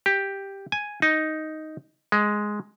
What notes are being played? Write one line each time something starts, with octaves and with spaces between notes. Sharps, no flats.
G4
G#5
D#4
G#3